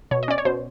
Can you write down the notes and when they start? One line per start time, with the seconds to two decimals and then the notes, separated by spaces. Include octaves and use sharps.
0.11 B2 C#5
0.23 D#5
0.28 C#4 D5
0.38 C#5
0.45 B2 C5